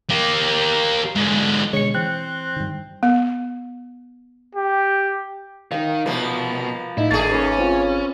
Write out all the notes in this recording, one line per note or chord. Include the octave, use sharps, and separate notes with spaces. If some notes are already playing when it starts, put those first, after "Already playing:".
A#3 G4
G#2 D3
B2 D3 G#3 C#5 C#7
E3 C4 F#6
G2 D#3
B3
G4
D#3 F5 E6
C2 B2 F3 A#3 B4 A#5 D6
A2 D#4 E4
G#1 A3 A#3 D4 G#4 A6
C#4 B4 D6
C4 F4